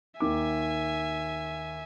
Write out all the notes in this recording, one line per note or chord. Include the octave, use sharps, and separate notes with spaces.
D#2 D#3 E5 G#5 D6